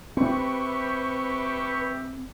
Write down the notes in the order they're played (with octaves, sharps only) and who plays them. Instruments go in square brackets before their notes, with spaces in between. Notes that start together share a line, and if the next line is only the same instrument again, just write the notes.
[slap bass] C4 [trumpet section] G4 E5 [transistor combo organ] B4 C#6